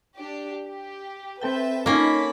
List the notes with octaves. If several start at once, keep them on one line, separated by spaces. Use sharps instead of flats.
D4 G4
G4
C4 A4 B4 E5 G5
A#3 C#4 D#4 F4 A4 C#5 B5